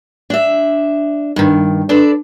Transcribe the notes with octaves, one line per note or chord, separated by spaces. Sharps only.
D4 E5
G2 D#3
D4 A4 B4 D5